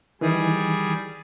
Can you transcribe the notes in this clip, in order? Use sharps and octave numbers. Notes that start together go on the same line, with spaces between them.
D#3 E3 G3 G#4